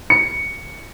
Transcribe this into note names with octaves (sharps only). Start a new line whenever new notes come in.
C#7